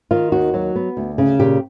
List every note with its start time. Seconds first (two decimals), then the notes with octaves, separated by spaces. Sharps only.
0.11 D#3 F4
0.32 D#2 F#4
0.54 F#3
0.76 B3
0.97 D2
1.18 C#3
1.39 A#2 G4